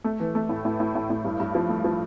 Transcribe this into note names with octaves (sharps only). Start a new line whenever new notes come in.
A3
E3
A3
A2
A2
A2
A2
A2
G2
G2
F3
A3
F3